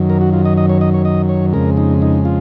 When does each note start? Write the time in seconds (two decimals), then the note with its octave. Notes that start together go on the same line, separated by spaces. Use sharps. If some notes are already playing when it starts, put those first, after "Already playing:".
Already playing: F#2 D#3 F#3
0.10 A#4
0.21 F#4
0.33 F4
0.45 D#5
0.57 D#5
0.69 C#5
0.81 D#5
0.94 C#5
1.05 D#5
1.29 C#5
1.53 F2 C#3 G#3 A#4
1.77 D#4
2.02 D#4
2.25 F4